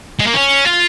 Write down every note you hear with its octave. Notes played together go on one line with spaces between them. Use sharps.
G#3
A#3
C#4
F4